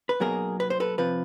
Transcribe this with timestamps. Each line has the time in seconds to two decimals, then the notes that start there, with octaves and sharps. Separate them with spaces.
0.09 B4
0.20 B1 B2 F#3 A#3 G#4 A#4
0.60 B4
0.70 C5
0.80 A4 B4
0.98 C3 F3 B4